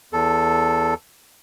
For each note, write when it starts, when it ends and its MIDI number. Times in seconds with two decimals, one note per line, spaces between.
0.13 0.94 40
0.13 0.94 69